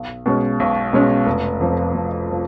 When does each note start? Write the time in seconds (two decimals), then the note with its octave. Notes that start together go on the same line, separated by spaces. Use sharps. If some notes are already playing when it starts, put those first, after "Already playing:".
Already playing: B1
0.26 B2 G#3 C#4
0.60 B1
0.93 B2 G#3 C#4
1.26 F1
1.61 F2 F3
1.94 F1
2.31 F3